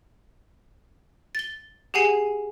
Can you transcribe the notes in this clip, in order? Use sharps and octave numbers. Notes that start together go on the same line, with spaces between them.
A6 G7
G4 G#4 F#5 G#5 C7